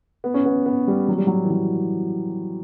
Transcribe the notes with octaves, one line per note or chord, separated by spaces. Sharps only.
B3
C#4
B3
B3
G3
F#3
G3
F#3
E3
F#3